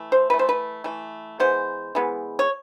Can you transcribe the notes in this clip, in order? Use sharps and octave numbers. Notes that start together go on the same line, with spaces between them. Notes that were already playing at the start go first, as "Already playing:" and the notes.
Already playing: E3 A3
C5
E3 A3 B4
C5
B4
E3 A3
E3 G#3 B3 C5
E3 G#3 B3
C#5